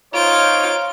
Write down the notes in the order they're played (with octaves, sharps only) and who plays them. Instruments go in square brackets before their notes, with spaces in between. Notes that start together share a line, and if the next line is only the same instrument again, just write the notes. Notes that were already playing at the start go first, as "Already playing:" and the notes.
[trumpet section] D#4 C5 C#5 [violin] F4 D7